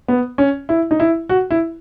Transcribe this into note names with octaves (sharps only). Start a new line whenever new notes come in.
B3
C#4
E4
D#4
E4
F#4
E4